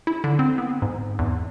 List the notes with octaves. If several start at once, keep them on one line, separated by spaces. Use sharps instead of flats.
E4
D3
C4
B3
G#2
E2